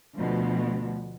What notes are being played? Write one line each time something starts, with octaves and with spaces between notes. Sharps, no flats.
D2 B2 F3